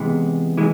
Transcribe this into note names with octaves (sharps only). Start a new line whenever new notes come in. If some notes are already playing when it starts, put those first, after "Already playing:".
Already playing: C3 E3 G#3 B3
E3 G#3